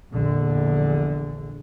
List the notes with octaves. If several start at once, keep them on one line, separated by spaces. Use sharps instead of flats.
A#1 E2 D3